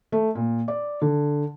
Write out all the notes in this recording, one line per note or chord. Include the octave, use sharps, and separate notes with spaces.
A3
A#2
D5
D3